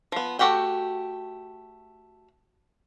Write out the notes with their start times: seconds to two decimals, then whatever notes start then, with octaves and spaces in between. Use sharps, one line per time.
0.12 F3 B3
0.39 A3 F#4 G4 F#5 G5